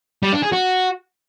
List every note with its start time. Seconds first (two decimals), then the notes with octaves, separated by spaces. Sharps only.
0.23 G3
0.33 D4
0.43 G#4
0.53 F#4